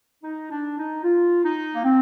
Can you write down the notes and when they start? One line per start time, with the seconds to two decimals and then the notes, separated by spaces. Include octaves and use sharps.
0.24 D#4
0.51 D4
0.78 D#4
1.03 F4
1.44 D#4
1.74 A#3
1.84 C4